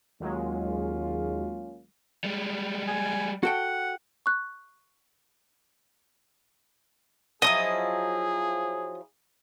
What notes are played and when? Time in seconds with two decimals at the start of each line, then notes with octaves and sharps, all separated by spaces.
0.20 D#2 F#3 G#3 A#3 C#4 F4
2.24 G3 G#3
2.88 G#5
3.43 F#4 A4 F#5 G5
4.26 C#6 F#6
7.42 F3 F#3 E4 G#4 D#5 D#6